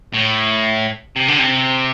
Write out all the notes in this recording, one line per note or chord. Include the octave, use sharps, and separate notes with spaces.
A2
C3
D3
C3